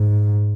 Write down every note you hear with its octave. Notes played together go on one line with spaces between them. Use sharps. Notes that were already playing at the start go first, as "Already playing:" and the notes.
Already playing: G#2